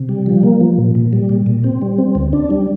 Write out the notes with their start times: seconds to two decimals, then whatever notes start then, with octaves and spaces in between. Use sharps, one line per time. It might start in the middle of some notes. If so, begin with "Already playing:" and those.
Already playing: C3
0.09 G3
0.26 F3
0.43 A#3
0.61 F3
0.78 A#2
0.95 A#2
1.13 G3
1.29 A#2
1.46 A#2
1.64 C4
1.82 G3
1.98 C4
2.15 D2
2.33 D4
2.50 G3